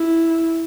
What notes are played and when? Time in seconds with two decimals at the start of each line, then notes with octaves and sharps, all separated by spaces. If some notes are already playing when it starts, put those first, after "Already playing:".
Already playing: E4